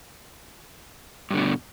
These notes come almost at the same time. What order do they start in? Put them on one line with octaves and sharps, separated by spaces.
G2 D3 B2